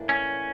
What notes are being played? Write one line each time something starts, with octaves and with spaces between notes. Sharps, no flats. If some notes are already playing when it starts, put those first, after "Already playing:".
Already playing: A2 E3 A#3 D4
C#4